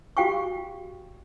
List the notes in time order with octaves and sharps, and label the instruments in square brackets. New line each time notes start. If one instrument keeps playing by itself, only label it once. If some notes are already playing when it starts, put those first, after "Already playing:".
[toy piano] F#4 G4 F5 G5 G#5 C#6